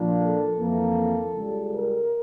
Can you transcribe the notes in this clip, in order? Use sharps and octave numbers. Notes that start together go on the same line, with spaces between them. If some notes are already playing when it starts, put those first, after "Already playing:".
Already playing: A#2 F3 A#3 D4 F4
A4
F2 E3 A#3
C#2 C#3 G3
A#4